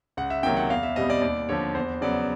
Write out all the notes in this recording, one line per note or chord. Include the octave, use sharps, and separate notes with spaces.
C#2 F#5
E5
C3 D#3 F#3 A#3 G5
F#5
E2 F5
E5
B2 G3 C4 D#5
D5
D#2 D5
D3 F3 C#5
E2 C5
C#3 F#3 B3 D5